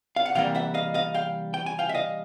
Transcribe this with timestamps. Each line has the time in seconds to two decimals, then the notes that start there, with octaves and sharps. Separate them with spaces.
0.16 F5
0.26 F#5
0.35 C3 E3 G3 A#3 F5 G5
0.55 E5 F#5
0.74 D#5 F5
0.94 D#5 F5
1.14 F5 G5
1.54 G5
1.66 G#5
1.79 F5 G5
1.89 E5
1.95 D#5 F5